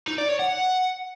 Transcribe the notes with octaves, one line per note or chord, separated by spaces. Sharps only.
D#4
D5
C#5
F#5